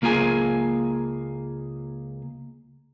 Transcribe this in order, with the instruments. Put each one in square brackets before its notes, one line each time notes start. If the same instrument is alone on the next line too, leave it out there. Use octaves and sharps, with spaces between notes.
[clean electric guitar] C#2 A#3 F4 G#4 G#5